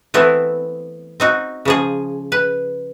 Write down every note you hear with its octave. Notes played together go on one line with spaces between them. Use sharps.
E3 A3 B3 C4 E4
C4 D#4 F#4
C#3 F3 G#4
B4